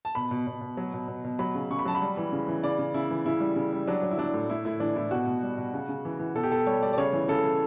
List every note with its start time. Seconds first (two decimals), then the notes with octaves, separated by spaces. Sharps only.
0.05 A5
0.15 B2 B5
0.31 B2
0.47 B2
0.61 B2
0.77 F#3
0.93 B2
1.08 B2
1.25 B2
1.39 F#3 B5
1.55 C#3
1.70 C#3 C#6
1.79 B5
1.85 F#3 A5
1.95 B5
2.02 G3
2.17 E3
2.32 C#3
2.48 E3
2.63 C#3 D5
2.78 C#3
2.94 C#3 E4
3.11 E3
3.26 C#3 E4
3.40 G3
3.56 C#3
3.73 G3
3.87 F#3 D4
4.03 F#3
4.11 E4
4.18 F#3 D4
4.34 A2
4.50 A2 E4
4.65 A2 E4
4.80 E3 D4
4.96 A2 E4
5.11 B2 F#4
5.27 B2
5.43 G3
5.58 B2
5.73 C#3
5.89 C#3
6.05 E3
6.20 E3
6.35 B2 A4
6.43 G4
6.51 B2 A4
6.66 G3 C#5
6.82 G3 D5
6.93 D5
6.98 C#3 C#5
7.13 E3
7.28 C#3 A4
7.44 E3